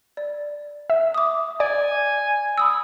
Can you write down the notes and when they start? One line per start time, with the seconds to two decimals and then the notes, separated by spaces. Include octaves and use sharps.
0.17 D5
0.90 E5
1.14 D6 D#6
1.60 D5 G#5
2.58 B5 D#6 E6